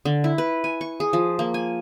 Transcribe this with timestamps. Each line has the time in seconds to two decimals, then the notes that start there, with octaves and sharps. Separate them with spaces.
0.05 D3
0.24 E4
0.38 B4
0.64 G#5
0.81 C#6
1.00 G#4
1.13 F3
1.39 A#3
1.54 G#5